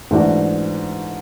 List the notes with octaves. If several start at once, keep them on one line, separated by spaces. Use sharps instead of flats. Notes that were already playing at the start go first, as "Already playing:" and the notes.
G#2 E3 A3 D4 F#4